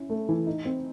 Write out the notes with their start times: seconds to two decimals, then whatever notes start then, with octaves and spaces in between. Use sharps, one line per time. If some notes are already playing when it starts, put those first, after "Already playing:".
Already playing: C#4 E4
0.10 A3
0.29 E3
0.47 D#4
0.65 C4